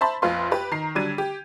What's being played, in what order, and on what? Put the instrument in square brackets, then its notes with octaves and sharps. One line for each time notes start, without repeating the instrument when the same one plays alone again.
[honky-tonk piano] C5 E5 A5 B5 C6
A#1 F2 F4 B4 F5 C6
G4 B4
D#3 A#5 C7
D3 F#3 G3 D4 G#6 D#7
G4